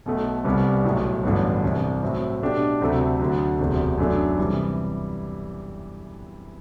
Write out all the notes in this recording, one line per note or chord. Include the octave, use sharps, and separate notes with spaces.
B1 B2 A3
C2 C3 G3 B3
B1 A2 F#3
A1 G2 D3 F#3 B3
C2 C3 E3
A2 F#3 C4 E4
B2 A3 D4 G4
D2 C3 F#3 A3
D2 D3 F#3
E1 D2 C3 F#3
F#2 F#3 A3 D4
C3 E3 G3